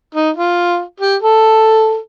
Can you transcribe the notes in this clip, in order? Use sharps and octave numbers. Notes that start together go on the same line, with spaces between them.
D#4
F4
G4
A4